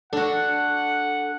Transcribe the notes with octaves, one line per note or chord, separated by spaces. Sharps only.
D4 F#4 A4 F#5